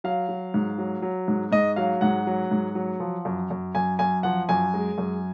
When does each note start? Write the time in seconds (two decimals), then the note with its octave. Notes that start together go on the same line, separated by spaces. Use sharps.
0.04 F#3 F5
0.29 F#3
0.54 G#2
0.78 F#3
1.02 F#3
1.28 G#2
1.52 G#2 D#5
1.76 F#3 F5
2.01 G#2 F#5
2.27 F#3
2.51 G#2
2.75 F#3
3.00 F3
3.25 F#2
3.50 F#2
3.75 F#2 G#5
3.99 F#2 G#5
4.23 F3 F#5
4.49 F#2 G#5
4.74 G#3
4.98 F#2